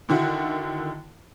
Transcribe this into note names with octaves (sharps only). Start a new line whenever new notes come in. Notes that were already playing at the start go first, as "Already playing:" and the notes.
D3 D#3 E4 F#4